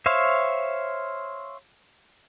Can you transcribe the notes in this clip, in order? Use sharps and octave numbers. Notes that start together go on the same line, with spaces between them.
C5 C#5 E5 F5